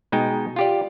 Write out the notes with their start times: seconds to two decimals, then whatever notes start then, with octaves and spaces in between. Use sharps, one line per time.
0.12 B2 G#3 D#4 G5
0.56 F4 G4 D5